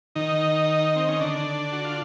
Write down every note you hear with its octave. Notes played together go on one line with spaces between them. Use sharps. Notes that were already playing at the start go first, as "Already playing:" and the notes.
D#3 D#4
C4
C#4
D3 D4
F#4
F4